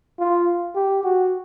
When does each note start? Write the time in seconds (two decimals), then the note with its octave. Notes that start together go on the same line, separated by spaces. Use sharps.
0.19 F4
0.76 G4
1.04 F#4